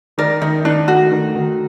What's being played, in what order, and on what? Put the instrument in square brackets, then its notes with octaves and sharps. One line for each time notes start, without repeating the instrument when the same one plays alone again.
[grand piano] D#3 [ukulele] A#4 D5
[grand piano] D#3 [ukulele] D#4
[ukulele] D4 [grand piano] D#4
[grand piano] A3 [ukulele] F#4
[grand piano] D#3
D#3